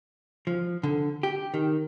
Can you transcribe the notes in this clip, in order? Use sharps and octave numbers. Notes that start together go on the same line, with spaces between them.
F3
D3
G4
D#3